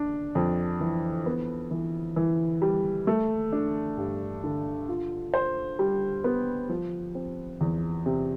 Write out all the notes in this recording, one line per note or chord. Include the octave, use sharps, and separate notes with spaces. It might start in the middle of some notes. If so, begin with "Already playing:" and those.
Already playing: D4
F2
E3
B3
E3
E3
G3
A3
D4
G2
D3
F4
C5
G3
B3
F3
C4
E2
C3